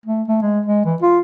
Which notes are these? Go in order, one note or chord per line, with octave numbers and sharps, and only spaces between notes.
A3
A3
G#3
G#3
E3
F4